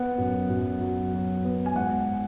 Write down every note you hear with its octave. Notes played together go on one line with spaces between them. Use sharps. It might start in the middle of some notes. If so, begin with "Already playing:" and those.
Already playing: B3 F#5
F#2
F#2
F#3
F#3
B3
G#5
G#2 F#5